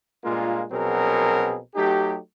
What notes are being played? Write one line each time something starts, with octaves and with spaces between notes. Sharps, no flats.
G2 A#2 G#3 A#3 F4
A#1 B2 F#3 C4 G#4 A#4
F#3 A3 D#4 G4